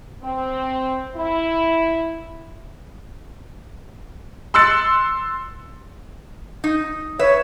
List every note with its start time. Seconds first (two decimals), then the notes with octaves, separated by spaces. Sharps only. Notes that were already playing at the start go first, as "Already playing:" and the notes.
0.23 C4
1.16 E4
4.54 C6 E6 F#6 A6 C#7
6.64 D#4
7.19 B4 C#5 E5